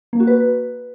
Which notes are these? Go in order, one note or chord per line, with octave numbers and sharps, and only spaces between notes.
A#3
F#4
B4